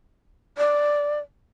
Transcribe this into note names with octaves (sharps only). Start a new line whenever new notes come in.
D5